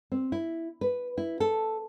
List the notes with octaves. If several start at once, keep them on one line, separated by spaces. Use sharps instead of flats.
C4
E4
B4
E4
A4